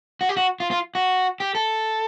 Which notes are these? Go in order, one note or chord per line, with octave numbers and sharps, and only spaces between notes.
F#4
G4
F#4
F4
F4
F#4
G4
A4